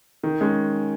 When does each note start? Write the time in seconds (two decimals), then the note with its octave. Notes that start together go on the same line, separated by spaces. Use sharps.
0.23 D#3
0.41 G#3 C#4